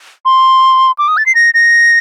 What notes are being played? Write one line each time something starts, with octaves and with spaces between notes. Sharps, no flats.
C6
D6
D#6
A6
C7
A#6
A#6